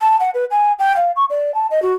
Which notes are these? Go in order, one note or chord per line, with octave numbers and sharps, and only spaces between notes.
A5
F#5
B4
G#5
G5
F5
C#6
D5
A5
D#5
F#4